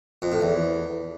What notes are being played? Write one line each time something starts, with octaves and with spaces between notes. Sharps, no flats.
F2
A2
E2